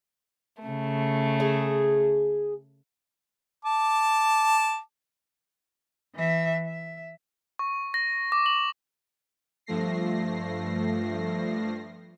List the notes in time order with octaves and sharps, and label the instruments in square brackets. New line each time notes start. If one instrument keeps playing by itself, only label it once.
[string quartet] C#3 A3
[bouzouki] G#4
[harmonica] A5 D6
[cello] E3 E5
E5
[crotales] C#6
A#6
D6
F#7
[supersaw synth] G2 F3 A3 A#6 C7